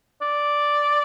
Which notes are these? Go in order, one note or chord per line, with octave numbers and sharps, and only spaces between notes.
D5